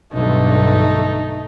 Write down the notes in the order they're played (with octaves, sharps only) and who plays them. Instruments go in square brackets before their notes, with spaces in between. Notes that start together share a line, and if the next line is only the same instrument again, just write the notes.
[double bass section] B1 G2 D3 [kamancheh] A3 D#4